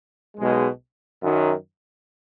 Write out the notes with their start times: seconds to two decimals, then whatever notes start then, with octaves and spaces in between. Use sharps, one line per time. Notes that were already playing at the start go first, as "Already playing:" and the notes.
0.38 B1 B2 G#3
1.23 F#2 D#3 F#3